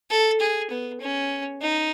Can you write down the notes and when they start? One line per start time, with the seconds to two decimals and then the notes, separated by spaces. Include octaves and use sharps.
0.10 A4
0.40 G#4
0.70 B3
1.01 C#4
1.61 D#4